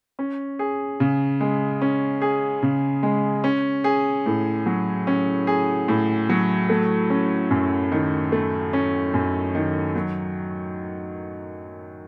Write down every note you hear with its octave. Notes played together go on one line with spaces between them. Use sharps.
C#4
G#4
C#3
G#3
C#4
G#4
C#3
G#3
C#4
G#4
A2
F#3
C#4
G#4
A2
F#3
A3
C#4
F#2
D#3
A3
C#4
F#2
D#3
F#3